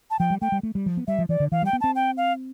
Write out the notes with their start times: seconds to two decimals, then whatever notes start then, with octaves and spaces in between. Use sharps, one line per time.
0.10 A5
0.19 F3 G5
0.30 G3
0.42 A3 G5
0.52 G3
0.63 A3
0.75 G3
0.86 F3
0.97 B3
1.07 G3 E5
1.19 F3
1.29 E3 D5
1.40 D3
1.52 E3 F5
1.62 G3 G5
1.73 B3
1.81 C4 A5
1.96 G5
2.17 F5